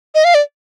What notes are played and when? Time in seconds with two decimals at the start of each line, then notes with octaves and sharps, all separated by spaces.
0.15 D#5
0.25 F5
0.34 D5